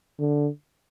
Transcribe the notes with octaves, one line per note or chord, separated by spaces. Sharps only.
D3